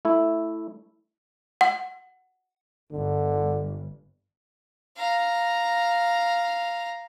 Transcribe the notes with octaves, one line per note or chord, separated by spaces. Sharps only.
A3 E4
F#5
G1 D3
F5 A#5